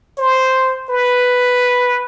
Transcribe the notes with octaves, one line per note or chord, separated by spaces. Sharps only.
C5
B4